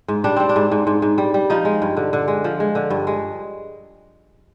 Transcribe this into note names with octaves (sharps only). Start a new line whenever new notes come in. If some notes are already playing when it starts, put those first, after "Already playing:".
G#2
G3 D4
G3 C4
D4
G#2
G#2
G#2
G#2
G3
G3
F3 D#4
G#3
G2
D3
D3
G#3
F3
G#3
D3
G2
G#3